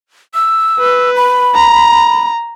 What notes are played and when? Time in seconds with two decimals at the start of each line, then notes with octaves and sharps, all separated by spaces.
0.35 E6
0.79 B4
1.16 B5
1.55 A#5